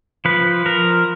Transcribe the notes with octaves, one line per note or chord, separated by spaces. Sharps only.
F3 B4
F3 A#4